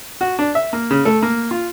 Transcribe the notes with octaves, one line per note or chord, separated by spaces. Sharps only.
F#4
D4
E5
A#3
C#3
A3
A#3
F4